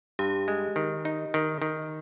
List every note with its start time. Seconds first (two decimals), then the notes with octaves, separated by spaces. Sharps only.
0.19 G2 G4
0.48 G#3
0.76 D#3
1.05 D#4
1.34 D#3
1.62 D#3